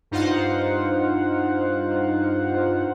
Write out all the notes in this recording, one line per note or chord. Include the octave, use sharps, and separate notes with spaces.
G2 D#4 F4 C5 F5 F#5